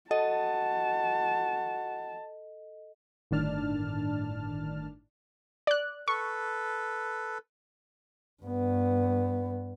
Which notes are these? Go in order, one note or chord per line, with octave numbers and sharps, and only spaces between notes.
F#4 A4 D#5 A5
G1 A2 D#3 D4 A5 F6
D5 F#6
A4 B4 C#6
G2 B3